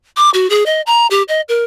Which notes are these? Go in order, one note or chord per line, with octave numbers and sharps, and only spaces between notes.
D6
F#4
G#4
D#5
A#5
G4
D#5
A#4